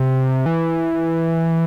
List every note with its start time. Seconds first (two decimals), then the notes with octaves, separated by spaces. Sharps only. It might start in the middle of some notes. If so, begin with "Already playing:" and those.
Already playing: C3
0.46 E3